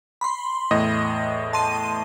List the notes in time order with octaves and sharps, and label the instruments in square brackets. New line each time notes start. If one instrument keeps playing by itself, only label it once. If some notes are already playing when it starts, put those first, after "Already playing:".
[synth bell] B5 C6
[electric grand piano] E2 A2 D#5
[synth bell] A5 C6 D#7